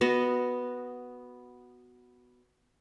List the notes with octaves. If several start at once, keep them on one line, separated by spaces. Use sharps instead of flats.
B3 F#4 D#5